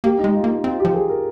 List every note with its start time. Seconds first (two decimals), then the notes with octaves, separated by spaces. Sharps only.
0.04 A#3 G4
0.19 D#4
0.24 G#3
0.34 F4
0.44 A#3
0.50 D#4
0.64 C4 F4
0.80 F3 G4
0.94 G#4
1.09 A#4